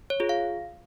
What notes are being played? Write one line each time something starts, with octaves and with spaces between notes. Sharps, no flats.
C#5
F4 G#4
F5